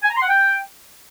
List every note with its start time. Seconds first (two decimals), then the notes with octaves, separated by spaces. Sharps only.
0.03 G#5
0.09 A#5
0.16 C6
0.22 F#5
0.29 G5